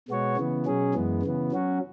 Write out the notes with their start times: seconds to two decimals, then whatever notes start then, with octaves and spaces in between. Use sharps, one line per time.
0.08 B2 G#3 B3 F#4 C#5
0.37 C#3 E3 B3
0.66 B2 F#3 C#4 G#4
0.94 F#2 E3 G#3 B3
1.23 C#3 E3 B3
1.52 F#3 C#4 F#4